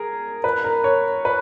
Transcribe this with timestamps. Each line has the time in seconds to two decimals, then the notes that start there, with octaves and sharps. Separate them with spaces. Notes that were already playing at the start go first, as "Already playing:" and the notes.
Already playing: G#4 A#4
0.44 B4
0.64 A#4
0.84 C#5
1.25 B4